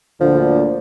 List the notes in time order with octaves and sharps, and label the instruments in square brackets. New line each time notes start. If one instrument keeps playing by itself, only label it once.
[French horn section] D2 A#2 D3 [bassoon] F3